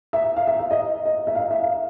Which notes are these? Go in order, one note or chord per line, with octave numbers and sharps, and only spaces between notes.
E5
F5
E5
E5
D#5
D#5
E5
F5
E5
E5
F5